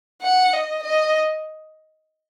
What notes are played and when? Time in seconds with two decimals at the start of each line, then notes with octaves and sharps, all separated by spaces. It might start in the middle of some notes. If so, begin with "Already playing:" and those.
0.22 F#5
0.53 D#5
0.83 D#5